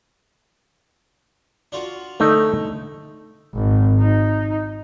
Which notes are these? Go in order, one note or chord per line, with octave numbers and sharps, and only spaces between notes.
D4 F4 F#4
D3 A3 D#4
G#1
D#4